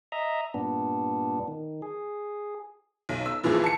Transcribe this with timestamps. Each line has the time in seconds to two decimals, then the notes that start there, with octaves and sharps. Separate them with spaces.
0.12 D#5 E5 A#5
0.54 G2 A#2 B3 D4
1.48 D#3
1.82 G#4
3.09 B1
3.26 E6
3.44 G2 A#2 E3 F3 G#4
3.64 A5 C#7